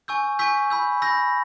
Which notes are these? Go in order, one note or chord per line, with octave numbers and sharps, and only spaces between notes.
G#5 C#6 E6 G6
G#5 C#6 E6 G6 B6
B5 E6 G6
B5 E6 G6 A#6